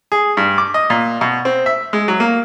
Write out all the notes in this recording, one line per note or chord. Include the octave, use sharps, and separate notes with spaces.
G#4
G2
D6
D#5
A#2
B2
C4
E5
G#3
F#3
A#3